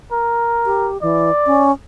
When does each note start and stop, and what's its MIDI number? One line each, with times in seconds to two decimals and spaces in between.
0.12 0.89 70
0.65 0.98 67
1.02 1.31 52
1.02 1.70 74
1.46 1.72 61